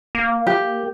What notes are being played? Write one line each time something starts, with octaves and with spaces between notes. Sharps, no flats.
A#3
G4